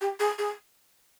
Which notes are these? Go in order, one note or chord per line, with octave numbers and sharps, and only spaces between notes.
G4
G#4
G#4